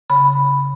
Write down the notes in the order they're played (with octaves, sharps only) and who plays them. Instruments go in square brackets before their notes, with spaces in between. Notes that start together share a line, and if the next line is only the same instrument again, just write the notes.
[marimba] C#3 B5